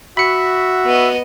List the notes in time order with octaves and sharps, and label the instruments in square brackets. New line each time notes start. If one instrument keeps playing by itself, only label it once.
[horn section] F#4 [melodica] E5 [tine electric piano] B5 C#7
[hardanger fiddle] B3 D#5